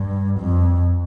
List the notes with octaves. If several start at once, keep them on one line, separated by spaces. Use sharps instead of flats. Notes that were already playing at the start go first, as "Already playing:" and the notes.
Already playing: G2
F2